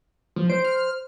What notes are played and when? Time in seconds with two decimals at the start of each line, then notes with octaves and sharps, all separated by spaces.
0.36 F3
0.50 C5 D7
0.65 F6